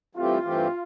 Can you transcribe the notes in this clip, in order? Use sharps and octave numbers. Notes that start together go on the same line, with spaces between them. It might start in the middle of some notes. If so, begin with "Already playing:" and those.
G2 E3 A3 C4 F4 G4
G2 E3 A3 C4 G4